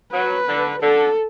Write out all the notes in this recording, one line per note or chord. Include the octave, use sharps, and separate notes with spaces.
F#3 B4
D3
D3 A4